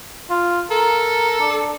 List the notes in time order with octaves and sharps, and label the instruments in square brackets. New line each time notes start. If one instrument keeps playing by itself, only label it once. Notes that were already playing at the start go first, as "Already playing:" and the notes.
[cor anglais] F4
[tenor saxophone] A4 [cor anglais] A#4
[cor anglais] D4